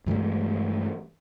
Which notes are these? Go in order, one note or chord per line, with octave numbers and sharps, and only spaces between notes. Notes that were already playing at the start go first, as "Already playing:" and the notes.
G2 E3 G#3 A3